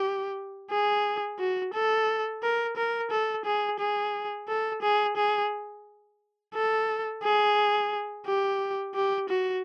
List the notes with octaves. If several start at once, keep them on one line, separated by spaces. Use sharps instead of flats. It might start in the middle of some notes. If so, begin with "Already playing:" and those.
Already playing: G4
G#4
F#4
A4
A#4
A#4
A4
G#4
G#4
A4
G#4
G#4
A4
G#4
G4
G4
F#4